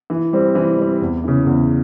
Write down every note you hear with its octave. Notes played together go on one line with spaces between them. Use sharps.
E3
G3 C4
E3
G3 C4
E2
C#3 E3
E2